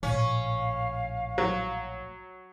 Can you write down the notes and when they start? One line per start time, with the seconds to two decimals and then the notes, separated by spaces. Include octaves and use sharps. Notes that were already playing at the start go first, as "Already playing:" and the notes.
0.03 A#1 A2 C#4 F5
1.38 F#3